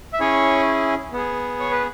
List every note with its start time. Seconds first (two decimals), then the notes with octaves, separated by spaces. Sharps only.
0.13 E5
0.20 C#4 E4 G#4 C#5
1.12 B3 G#4
1.60 C#5
1.71 B4